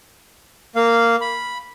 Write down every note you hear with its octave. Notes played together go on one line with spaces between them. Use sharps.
A#3 F5
B5